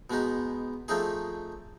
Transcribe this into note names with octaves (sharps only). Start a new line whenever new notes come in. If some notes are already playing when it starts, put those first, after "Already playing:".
B2 G#3 B3 D#4
F3 A3 C4 D#4 G#4